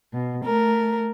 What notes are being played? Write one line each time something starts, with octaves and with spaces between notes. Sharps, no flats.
B2
A3 A#4